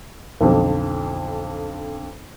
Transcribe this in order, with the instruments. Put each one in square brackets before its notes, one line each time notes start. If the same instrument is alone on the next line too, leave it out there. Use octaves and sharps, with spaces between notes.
[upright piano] B1 F2 D3